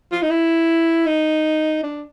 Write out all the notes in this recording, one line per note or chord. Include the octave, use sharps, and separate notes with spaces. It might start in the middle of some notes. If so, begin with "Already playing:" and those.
F4
D#4
E4
D#4
D4